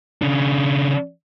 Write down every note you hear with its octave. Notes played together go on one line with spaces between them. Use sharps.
C#3 D4